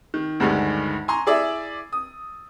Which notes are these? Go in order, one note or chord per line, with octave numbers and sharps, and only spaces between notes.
D#3
D2 G2 D3 D#3 G#3
G#5 A#5 C6 C#6
E4 G#4 D5 E5
D#6